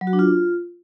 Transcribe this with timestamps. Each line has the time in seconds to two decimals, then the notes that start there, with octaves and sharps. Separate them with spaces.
0.01 F#3
0.07 F#4
0.13 D4
0.19 F4